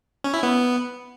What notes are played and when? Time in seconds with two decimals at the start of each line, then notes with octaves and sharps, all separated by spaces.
0.24 C#4
0.34 E4
0.43 B3